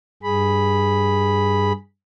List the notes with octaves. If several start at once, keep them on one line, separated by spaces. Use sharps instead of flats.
G2 G#4 B5